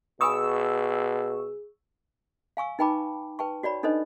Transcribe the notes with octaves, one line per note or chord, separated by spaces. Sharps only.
B2 G#4 G#5 B5 C#6 D#6 E6
F5 G#5 C#6 E6
D#4 B4 G5 A5 B5 D6
B4 G5 A5 C#6
F#4 C#5 D5 B5
D4 D#4 A4 B4 C5 D#5